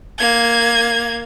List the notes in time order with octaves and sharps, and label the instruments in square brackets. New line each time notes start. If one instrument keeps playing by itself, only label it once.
[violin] A#3 G#6